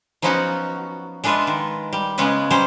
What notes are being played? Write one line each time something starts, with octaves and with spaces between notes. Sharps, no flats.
F3 F#3 B3 C#4 D#4 F#4
G#3 D4 F4 B4 E5
D#3
G3
C#3 G#3 B3 C#4 B4
F#3 G3 C#4 C5